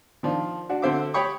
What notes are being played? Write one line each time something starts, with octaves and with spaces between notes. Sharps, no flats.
D#3 F3 D4
D4 F#4
D3 C4 F#4 C5 E5 D6
G4 C#5 G5 B5 C#6 D#6